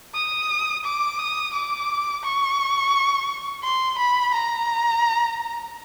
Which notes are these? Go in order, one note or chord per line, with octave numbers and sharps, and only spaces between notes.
D#6
D6
D#6
D6
C#6
C6
B5
A#5